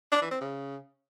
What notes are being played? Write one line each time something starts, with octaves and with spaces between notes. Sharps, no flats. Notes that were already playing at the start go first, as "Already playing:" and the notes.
D4
E3
C4
C#3